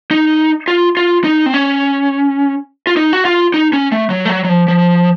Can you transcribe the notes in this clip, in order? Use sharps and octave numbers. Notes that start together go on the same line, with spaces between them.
D#4
F4
F4
D#4
C4
C#4
F4
D#4
F#4
F4
D#4
C#4
A3
F#3
A3
F#3
F#3
F3
F3